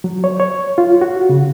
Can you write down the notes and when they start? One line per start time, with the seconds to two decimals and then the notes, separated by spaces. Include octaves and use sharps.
0.04 F#3
0.24 C#5
0.40 C#5
0.78 F4
1.01 F#4
1.29 C#3